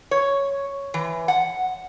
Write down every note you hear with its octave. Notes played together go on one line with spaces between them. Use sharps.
C#5
E3
F#5